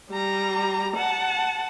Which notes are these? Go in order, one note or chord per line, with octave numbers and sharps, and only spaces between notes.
G3 A#5
F#5 A5